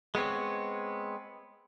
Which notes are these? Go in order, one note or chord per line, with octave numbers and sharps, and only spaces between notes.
G#3 B3 C4 C#5